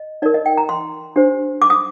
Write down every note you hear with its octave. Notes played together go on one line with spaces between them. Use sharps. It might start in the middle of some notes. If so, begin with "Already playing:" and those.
Already playing: D#5
D#4 A#4 D5
D#5
G5
A#5
C6
D4 G4 C5
D6
D#6